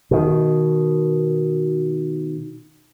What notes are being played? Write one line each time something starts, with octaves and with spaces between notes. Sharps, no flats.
B2 D#3